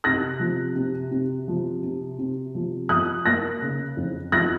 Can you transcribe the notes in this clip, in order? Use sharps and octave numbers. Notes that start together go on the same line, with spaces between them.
C3 F#6 A#6
F3
C3
C3
F3
C3
C3
F3
F3 D#6 F#6
A#3 F#6 A#6
C#3
F2
F3 F#6 A#6